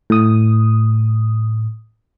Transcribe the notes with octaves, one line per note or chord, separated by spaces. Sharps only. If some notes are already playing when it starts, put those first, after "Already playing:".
A2 D#6